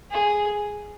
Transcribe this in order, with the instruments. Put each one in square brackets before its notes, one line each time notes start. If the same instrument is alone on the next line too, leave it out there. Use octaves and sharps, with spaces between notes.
[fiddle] G#4